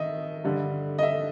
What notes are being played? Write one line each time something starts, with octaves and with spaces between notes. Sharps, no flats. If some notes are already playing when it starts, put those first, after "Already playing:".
Already playing: D#3 D#5 E5
G2 D3 G3
D#5
E5